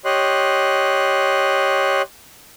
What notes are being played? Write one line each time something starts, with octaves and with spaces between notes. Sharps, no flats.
G4 C#5 D#5 C6 F#6